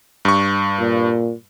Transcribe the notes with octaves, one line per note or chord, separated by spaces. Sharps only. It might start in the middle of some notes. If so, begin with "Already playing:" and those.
G2 C#6
A#2